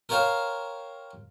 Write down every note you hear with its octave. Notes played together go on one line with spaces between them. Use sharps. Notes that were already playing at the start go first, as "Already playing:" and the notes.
A#4 C5 C#5 F5 G5